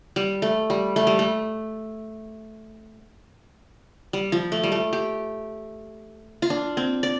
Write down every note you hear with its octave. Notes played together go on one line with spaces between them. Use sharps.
G3
A3
G3
A3
G3
A3
G3
F3
A3
G3
A3
G4
F4
D4
C4
D5